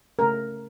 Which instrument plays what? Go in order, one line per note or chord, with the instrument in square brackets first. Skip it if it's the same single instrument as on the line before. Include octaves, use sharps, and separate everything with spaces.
[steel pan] C#3 A3 C#4 A#4